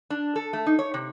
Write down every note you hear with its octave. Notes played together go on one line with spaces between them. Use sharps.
D4
A4
A3
D#4
C#5
C3